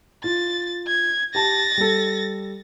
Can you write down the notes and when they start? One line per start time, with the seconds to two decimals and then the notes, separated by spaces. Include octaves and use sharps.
0.24 F4 A6
0.87 G#6
1.35 G4 A5 A6 A#6
1.78 G3 A4